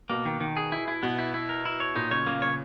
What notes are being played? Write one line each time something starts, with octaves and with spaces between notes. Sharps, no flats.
B2 A#3
D#3
D#3
G#4
E4
E4
B2 B3
E4
E4
A#4
E4
C#5
A#2 D#4
C#3 C#5
C#3 A#3
C#3 C#5